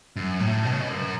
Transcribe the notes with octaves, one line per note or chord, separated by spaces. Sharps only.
F#2
A2
B2
C#3
B2
F#2